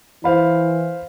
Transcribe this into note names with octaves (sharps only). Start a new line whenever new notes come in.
E3 E4 C5 F5 B5